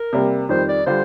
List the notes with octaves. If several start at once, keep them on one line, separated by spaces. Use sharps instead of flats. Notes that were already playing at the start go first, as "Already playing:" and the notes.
Already playing: A#4
C3 G3 A#3
F2 D#3 G3 C5
D5
D3 G3 D4 F4 C5